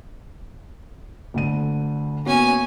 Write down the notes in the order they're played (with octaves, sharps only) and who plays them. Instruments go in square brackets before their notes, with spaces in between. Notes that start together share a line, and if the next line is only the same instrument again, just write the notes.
[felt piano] D2 D3 D#7
[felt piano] A#3 B3 F#4 [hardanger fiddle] C#4 G#5